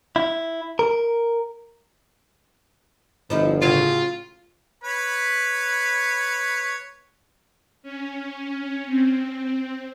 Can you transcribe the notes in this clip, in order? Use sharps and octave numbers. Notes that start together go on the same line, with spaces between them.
E4
A#4
G1 F3 D#4 E4
A2 C#3 F#3 F4
B4 C#5 B5
C#4
C4